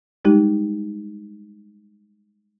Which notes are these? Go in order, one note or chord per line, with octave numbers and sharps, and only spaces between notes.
G3 G#3 D#4 G4